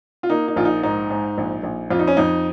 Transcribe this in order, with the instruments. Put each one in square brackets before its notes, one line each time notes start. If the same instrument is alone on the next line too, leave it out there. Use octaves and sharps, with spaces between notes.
[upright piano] F4
A#3 D#4
D#4
A#1 F4
D#4
G#2 D#4
G#2
A#1
A#1
F2 F4
D#4
C#4
F2 D#4